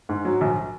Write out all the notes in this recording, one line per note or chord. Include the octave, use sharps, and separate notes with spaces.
G#2
F#3
A#1